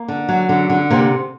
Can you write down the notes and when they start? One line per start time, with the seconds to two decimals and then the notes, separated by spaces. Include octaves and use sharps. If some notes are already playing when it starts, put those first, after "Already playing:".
Already playing: A#3
0.08 D3
0.29 F#3
0.49 D3
0.70 D3
0.90 C3 A#3